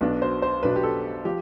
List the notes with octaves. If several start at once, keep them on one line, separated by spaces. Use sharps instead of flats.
B1 B2 B3 D4
C5
C5
B1 B2 B3 D4 B4
G4
A4
F3 G4